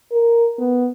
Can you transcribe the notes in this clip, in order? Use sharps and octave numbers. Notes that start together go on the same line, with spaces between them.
A#4
B3